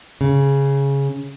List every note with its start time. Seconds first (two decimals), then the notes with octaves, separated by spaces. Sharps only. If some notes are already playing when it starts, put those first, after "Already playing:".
0.21 C#3